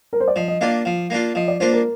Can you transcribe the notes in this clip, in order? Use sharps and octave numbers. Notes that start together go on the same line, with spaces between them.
A#4
C5
D5
F3 D#5
D#5
A#3 D4 F4 F5
F3 F5
A#3 D4 F4
F3 D#5
D5
A#3 D4 F4 C5
A#4